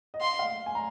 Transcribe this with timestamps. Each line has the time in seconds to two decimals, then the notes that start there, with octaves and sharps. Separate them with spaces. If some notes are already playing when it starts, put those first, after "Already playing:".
0.14 D#5
0.21 F5 C6
0.39 F5
0.66 G#5
0.75 A#5